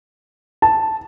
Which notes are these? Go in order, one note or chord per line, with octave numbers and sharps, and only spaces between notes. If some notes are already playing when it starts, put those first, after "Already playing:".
A5